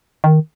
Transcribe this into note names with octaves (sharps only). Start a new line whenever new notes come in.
D#3